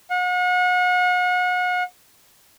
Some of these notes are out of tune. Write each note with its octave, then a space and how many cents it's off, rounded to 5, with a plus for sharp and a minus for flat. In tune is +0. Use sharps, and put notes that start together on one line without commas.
F#5 -35